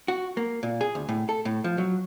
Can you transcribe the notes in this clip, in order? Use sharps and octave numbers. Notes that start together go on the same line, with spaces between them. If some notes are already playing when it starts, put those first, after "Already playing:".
F#4
A#3
A#2
G#4
D2
A2
A4
A2
F3
F#3